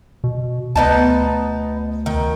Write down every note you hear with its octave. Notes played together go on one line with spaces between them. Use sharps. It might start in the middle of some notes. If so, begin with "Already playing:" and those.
B2
D2 B3 D#4 A5
D#3